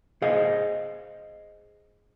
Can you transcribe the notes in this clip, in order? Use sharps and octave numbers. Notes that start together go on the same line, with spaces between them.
G#4 C5 D#5 F5